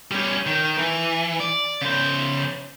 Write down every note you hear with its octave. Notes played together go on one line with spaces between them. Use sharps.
G3 C#4
D#3
E3
D5
C#3 C5